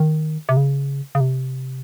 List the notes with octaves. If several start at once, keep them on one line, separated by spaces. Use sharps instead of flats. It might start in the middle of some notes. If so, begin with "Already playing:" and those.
Already playing: D#3
C3
C#3
C#3
C3